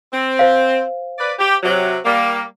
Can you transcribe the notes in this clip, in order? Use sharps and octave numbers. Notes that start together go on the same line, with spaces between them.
C4
C5 F5
B4 D5
G4
C3 F#3
G3 A#3